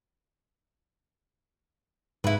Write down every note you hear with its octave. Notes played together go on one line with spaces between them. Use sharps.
G#2 E4 B4